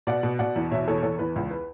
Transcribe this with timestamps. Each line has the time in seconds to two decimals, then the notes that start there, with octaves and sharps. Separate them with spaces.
0.07 B2 D5 F#5
0.23 B2
0.39 B2 D5 F#5
0.56 E2
0.71 B2 C#5 E5
0.88 E2 A4 C#5
1.03 E2 A4 C#5
1.19 E2 B4
1.36 C#2
1.51 B4